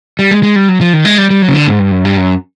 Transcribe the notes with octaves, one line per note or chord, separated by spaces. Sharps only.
G3
G#3
G#3
G3
F#3
F3
D#3
G#3
G3
G3
F#3
C#3
D3
G#2
G2
F#2
G2
F#2